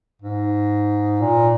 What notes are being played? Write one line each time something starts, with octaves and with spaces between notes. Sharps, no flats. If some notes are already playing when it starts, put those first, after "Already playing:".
G#2
A#2